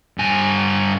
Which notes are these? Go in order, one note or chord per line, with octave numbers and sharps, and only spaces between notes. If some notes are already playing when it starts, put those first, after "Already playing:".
G2 G#5